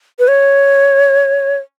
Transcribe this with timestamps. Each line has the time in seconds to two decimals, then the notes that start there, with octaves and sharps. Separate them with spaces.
0.19 B4
0.28 C#5